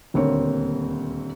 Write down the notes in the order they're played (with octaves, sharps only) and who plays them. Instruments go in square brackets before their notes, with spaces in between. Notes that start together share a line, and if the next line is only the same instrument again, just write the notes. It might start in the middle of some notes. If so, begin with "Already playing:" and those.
[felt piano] D#1 D2 A#3 C4 C#5